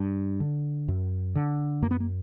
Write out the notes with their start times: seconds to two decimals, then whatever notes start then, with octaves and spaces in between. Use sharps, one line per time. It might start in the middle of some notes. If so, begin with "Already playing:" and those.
Already playing: G2
0.40 D3
0.88 F#2
1.35 D3
1.82 F#2 A#3
1.91 B3
2.00 A#3